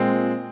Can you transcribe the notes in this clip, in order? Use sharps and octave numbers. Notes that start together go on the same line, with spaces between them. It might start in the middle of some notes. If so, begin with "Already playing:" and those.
Already playing: A#2 G#3 C4